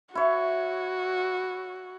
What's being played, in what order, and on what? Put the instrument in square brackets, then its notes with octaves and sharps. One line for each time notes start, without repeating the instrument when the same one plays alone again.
[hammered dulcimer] E4 C#5 [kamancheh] F#4